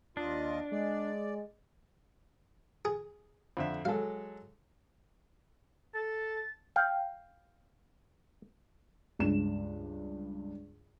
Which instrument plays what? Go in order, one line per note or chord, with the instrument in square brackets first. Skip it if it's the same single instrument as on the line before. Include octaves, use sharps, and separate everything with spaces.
[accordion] D#2 F4 D#5 [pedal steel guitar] D4
[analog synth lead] G#3 [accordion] D5
[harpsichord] G#4
[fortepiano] F2 D3 E5
[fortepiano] F#3 G#3 A4 [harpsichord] F5
[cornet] A4 [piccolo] A6
[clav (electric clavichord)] F5 G5
[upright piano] C#2 G2 E7